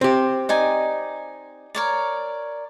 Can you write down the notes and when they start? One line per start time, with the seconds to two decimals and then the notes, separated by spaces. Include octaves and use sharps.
0.01 C4 G4
0.49 D#4 D5 G#5
1.75 A#4 C#5 D5